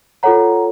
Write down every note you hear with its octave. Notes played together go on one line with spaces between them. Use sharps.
F4 A4 C#5 F#5 A#5